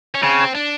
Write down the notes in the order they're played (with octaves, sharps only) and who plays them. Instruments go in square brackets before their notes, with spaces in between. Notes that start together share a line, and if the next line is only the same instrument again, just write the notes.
[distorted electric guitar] C#4
[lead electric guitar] C#3 [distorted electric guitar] C4
[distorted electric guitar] D4